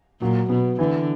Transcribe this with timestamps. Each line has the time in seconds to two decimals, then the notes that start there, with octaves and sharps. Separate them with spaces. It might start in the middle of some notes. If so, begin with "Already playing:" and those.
0.21 A#2 F#3
0.49 B2 B3
0.79 D3 E3